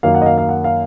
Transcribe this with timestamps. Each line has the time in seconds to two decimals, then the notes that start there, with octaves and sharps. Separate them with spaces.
0.03 F#2 D#3 A#3 F5
0.15 F#5
0.22 D#5
0.26 F5
0.38 F5
0.49 F#5
0.64 F5